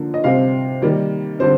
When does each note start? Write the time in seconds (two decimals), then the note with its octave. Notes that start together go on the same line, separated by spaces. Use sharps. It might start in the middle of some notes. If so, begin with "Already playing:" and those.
Already playing: D3 F3 A#3
0.14 D#5
0.24 C3 G3 C4 F5
0.82 D#3 G3 A#3
1.39 D3 G3 C4 C5